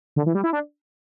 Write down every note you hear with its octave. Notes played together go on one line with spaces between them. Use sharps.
D3
E3
G3
E4
D4